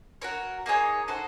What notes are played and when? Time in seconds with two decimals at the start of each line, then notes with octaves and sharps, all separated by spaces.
0.22 F#4 A#4 C#5
0.66 A#3 D#4 G#4 C#5
1.08 D#4 F#4 A4 C5